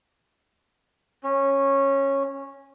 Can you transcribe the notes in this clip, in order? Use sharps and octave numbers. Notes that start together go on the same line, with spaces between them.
C#4